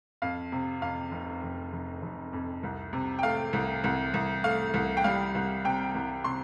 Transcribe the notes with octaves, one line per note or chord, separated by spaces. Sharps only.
F2 F5
C3
F2 F5
F1
F1
F1
F1
F2
C2
C3
G5
A3 F5
C2
C2
C2
A3 F5
C2
G5
G3 F5
C2
C3 G5
C2
C3 C6